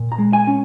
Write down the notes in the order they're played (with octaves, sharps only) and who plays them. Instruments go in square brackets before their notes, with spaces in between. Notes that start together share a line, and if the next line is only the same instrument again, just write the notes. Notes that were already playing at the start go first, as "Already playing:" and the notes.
Already playing: [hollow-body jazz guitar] A#2
A#5
G#3
G#5
C#4